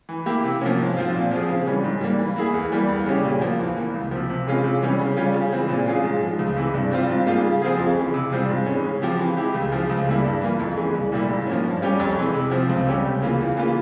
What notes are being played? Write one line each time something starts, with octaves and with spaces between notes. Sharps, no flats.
E3
A#3 E4 G4
C3
F3 A#3 C#4
G#2
F3 C4 F4
A#2
F3 C4 F4 G#4
C#3
E3 G3 C#4
G#2
G3 A#3
E3
A#3 E4 G#4
E2
E3 G3 A#3
E2
C#3 G3 C#4 G4
A#2
F3 A#3
E2
E3 A#3
C#2
C3 F3
C3
E3 G#3 C#4 F4
C3
E3 G3 C#4
C#3
G3 C#4 F4
C#3
E3 G#3 C4 F4
A#2
G#3 C#4 F4 G#4
G#2
F3 G#3
C#2
C3 E3 G#3
G2
G3 C4 F4
G#2
G3 A#3 F4 G#4
C#3
F3 C4 F4 G#4
F2
C#3 E3
C3
G3 C4 F4 G#4
G#2
E3 G#3 C#4
C#3
F3 C4 G4
E3
G#3 E4 G4
C#2
C#3 F3
C#2
C#3 G3 A#3 E4
G2
E3 A#3 F4
F2
C#3 E3 G#3
C2
A#2 G3 A#3 E4
G#2
F3 A#3 C#4
G2
G3 C#4 G4
F2
C3 E3 G#3
C3
F3 C4
C#2
C3 G3 C#4 G4
C#2
C#3 E3 A#3 F4
E2
C#3 E3 A#3 F4